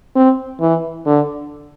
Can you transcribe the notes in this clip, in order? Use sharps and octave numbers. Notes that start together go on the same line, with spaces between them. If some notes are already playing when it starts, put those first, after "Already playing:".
C4
E3
D3